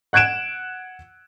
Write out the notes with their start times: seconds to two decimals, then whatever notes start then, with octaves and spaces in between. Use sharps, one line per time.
0.13 F#5 F#6 G#6 D7 E7